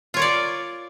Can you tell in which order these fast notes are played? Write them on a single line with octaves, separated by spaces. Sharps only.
F4 C#5 A#4 D5